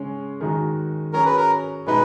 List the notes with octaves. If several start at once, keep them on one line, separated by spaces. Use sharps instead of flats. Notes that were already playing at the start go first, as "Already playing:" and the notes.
Already playing: C#3 G#3 C#4
D#3 G#3 D#4 F#4
F#3 C#4 G#4 A#4
B4
A#4
B2 G#3 D#4 B4